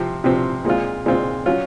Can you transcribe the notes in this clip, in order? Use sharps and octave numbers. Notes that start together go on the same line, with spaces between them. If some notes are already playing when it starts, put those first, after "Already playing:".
Already playing: C3 F3 C4
C3 F3 C4
A#2 G#3 C4 F4
A#2 G#3 C4 F4
F#3 C#4 F4